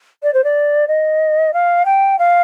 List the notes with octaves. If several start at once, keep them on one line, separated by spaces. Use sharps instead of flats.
D5
C5
D5
D#5
F5
G5
F5